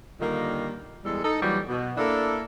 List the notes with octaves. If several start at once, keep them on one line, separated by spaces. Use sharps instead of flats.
A#2 D3 D#3 G3 A#3
E2 G3 G#3 A4
D#4 A4
A#2 E3 F#3 G3
B2
A#3 D4 E4 A4